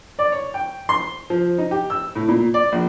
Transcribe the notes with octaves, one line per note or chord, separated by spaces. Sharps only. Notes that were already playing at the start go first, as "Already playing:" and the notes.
D5
C#5
G5
C6
F3
D#4
G4
E6
A2
A#2
D5
A#1